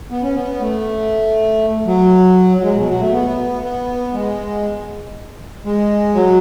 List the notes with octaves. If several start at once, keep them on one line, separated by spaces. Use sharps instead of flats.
B3
C#4
B3
A3
F#3
F#3
G#3
B2
F#3
A3
B3
B3
G#3
G#3
F#3